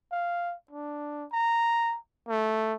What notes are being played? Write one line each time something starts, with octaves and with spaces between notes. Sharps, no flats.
F5
D4
A#5
A3